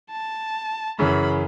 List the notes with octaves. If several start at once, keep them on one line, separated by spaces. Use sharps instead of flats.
A5
F#2 C#3 E3 C#4 B5